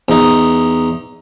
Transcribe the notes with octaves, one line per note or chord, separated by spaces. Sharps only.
E2 D#4